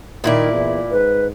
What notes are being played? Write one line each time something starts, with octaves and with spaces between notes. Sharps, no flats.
A#2 D#3 E4 D5
E2
G#2 B4